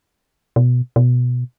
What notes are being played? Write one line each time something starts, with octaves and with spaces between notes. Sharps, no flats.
B2
B2